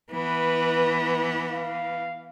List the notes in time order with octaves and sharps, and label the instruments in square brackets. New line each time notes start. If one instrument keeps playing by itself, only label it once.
[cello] E3 B3 [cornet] B4
[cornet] F5